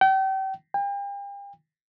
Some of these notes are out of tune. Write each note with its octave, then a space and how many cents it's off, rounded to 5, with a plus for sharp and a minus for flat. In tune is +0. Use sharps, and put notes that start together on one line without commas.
G5 -35
G5 +40